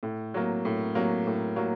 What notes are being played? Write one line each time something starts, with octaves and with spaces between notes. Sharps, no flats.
A2
F#3 A#3
A2
F#3 A#3
A2
F#3 A#3